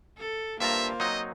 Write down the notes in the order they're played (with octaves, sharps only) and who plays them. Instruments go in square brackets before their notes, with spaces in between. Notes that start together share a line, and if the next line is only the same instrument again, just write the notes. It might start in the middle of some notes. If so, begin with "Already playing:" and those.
[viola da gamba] A4
[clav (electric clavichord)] G2 A5 A#5 [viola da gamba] A#3 [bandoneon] F4 C5 [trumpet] E5
[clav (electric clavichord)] F#3 C4 D#4 [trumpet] D#5